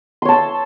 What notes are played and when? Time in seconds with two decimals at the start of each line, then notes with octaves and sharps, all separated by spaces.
0.22 C6
0.25 C#5
0.28 A5
0.32 E6